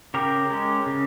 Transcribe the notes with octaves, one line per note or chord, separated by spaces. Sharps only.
C#3 G4 A#4
G#3 C#4
C#3